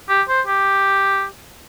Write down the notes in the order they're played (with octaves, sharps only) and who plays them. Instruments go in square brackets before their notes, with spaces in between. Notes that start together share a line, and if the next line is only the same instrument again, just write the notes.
[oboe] G4
C5
G4